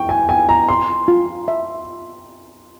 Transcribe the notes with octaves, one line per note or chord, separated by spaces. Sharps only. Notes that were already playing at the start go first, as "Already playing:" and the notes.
Already playing: G5 C#6
G#5
G5 G#5
A#5
A#5 C6
F4
E5